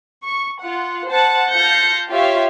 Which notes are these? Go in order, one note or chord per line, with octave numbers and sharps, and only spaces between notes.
C#6
F4 F#5
C5 F#5 A5
F4 F5 A5 G6 A#6 C#7
F4 G4 C#5 E5 F5